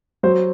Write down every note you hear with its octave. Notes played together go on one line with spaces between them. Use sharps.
F#3 C5